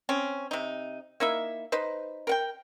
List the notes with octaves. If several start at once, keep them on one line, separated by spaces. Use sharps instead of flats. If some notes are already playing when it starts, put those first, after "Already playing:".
C4 C#4
C3 D#4
A#3 D#4 E4 E5
D#4 B4 C5
A#4 F#5 G5